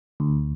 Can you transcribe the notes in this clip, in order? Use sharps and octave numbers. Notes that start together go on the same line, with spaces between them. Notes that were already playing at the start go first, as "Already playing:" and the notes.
D2